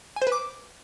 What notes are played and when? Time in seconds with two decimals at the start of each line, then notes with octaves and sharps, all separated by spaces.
0.16 G#5
0.22 C5
0.27 B4
0.32 D6